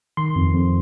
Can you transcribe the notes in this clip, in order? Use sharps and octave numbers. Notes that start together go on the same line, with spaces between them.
D#3 C6
F2
F2